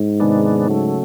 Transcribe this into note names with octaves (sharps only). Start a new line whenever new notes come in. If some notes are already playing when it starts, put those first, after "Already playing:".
Already playing: G#2
C3 D#3 G#3 B3 D4
C#3 F#3 A3